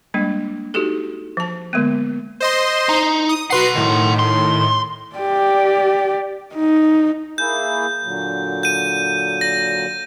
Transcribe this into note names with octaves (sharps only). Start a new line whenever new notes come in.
G3 G#3 A#3 D4
D#4 F#4 G4 A4
F3 A5
D3 G#3 A#3 B3
C5 D#5 C6
D#4
D#6
F#4 B4 F#5 C6 C7
A2 D#3
C6
G4 D5
D#4
A#3 E4 G#4 G6
A#2 D3 F#3
G6 D#7
A#6